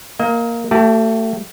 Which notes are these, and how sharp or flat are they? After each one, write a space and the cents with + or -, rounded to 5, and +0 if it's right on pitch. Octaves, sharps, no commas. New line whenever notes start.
A#3 +0 D#5 +35
A3 +30 G4 -35 A5 -5